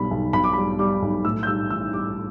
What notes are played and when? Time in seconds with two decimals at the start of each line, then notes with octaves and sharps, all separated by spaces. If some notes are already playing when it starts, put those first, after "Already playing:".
Already playing: B1 B2 G3 B5
0.11 B1
0.33 B1 B5
0.44 D6
0.53 G3 B5
0.79 G3 D6
1.02 B1
1.25 A2 E6
1.43 G6
1.47 G3 E6
1.70 A1 E6
1.93 G3 D6